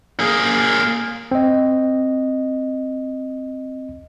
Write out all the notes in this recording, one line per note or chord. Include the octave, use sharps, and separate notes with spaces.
A#3 G#4
C4 D#5